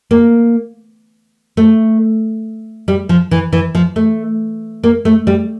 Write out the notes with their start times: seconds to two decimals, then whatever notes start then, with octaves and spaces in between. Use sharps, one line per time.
0.11 A#3
1.57 A3
2.88 G3
3.09 F3
3.31 E3
3.53 E3
3.75 F3
3.96 A3
4.83 A#3
5.05 A3
5.27 G3